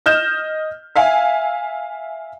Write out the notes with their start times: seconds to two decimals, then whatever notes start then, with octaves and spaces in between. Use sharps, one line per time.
0.06 D#5 F6 G6 E7
0.96 E5 F5 G#5